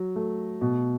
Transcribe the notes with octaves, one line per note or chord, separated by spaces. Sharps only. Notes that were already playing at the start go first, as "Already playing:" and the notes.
Already playing: F#3
A3
B2